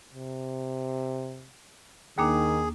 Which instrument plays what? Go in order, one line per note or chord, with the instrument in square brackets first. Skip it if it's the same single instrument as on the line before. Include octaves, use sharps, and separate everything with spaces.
[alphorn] C3
[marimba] D#2 A#3 D4 [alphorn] D#3 [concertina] G#4